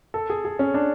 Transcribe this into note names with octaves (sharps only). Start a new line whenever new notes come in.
A4
G#4
G#4
C#4
D4